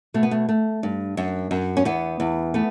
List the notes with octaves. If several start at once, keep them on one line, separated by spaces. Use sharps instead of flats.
B2 A3
B3
A3
A3
G2
F#2
F#2
C#4
E2 B3
E2
A3 B3